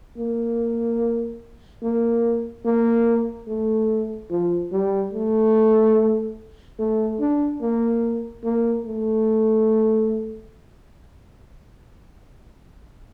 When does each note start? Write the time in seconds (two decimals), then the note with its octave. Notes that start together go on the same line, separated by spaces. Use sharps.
0.17 A#3
1.83 A#3
2.65 A#3
3.47 A3
4.31 F3
4.72 G3
5.13 A3
6.79 A3
7.21 D4
7.62 A#3
8.44 A#3
8.86 A3